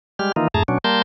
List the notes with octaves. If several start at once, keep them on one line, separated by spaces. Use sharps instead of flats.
G3 G#3 G4 F6
D#3 E3 A#3 D#4 F4
F2 G#2 A3 G#4 A5 A#5
B2 F#3 C#4 D4
G3 A#3 A#4 A5 C6 G6